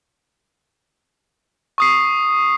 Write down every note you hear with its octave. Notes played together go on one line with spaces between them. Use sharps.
C#6 D#6 C7